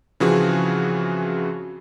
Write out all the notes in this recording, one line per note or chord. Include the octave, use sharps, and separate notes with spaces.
C#3 E3 F3 C4 F#4 G#4